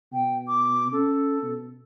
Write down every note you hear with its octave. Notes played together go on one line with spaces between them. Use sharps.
B2 G5
D6
C#4 A4
B2